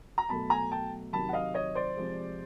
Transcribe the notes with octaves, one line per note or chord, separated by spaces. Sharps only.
A#5
B2 F#3 A3 A5 B5
G#5 A#5
G5 A5
C3 D#3 F#3 A5 B5
F#5
D#5 F5
C#5 D#5
C5 D5
C3 F3 G#3